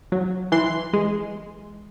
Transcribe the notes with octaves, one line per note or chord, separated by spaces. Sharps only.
F#3
E3 C6
G#3